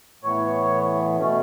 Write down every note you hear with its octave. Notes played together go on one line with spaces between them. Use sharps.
A2 E3 B3 C#5
B2 A3 C#4